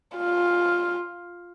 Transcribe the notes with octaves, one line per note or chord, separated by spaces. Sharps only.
F4